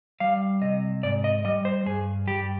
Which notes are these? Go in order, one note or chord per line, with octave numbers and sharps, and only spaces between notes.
G3 F5
C3 D#5
G#2 D5
D#5
G3 D#5
C5
G2 G#4
G3 G4